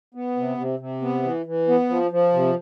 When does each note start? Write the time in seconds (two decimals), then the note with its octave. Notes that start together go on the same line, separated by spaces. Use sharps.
0.14 B3
0.36 C3
0.58 C3
0.79 C3
1.02 B3
1.24 E3
1.46 E3
1.68 B3
1.89 F3
2.11 F3
2.33 C3